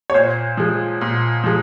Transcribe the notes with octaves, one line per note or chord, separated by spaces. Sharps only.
C#5
A#2 C5
F3 G#3
A#2
F3 G#3